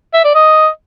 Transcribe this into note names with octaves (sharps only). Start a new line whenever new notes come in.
E5
D5
D#5